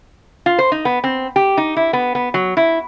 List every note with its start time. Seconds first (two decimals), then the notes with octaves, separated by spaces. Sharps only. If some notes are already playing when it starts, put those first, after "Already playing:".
0.46 F4
0.59 C5
0.72 D#4
0.85 B3
1.04 C4
1.36 G4
1.57 D#4
1.76 E4
1.93 B3
2.15 B3
2.34 F#3
2.57 E4